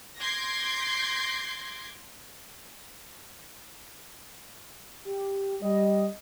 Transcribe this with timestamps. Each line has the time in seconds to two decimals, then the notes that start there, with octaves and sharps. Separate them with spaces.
0.20 C6 D6 G6 G#6 A#6 C7
5.05 G4
5.62 G3 D#5